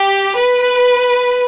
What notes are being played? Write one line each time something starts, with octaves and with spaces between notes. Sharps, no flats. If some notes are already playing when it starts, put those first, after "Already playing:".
Already playing: G4
B4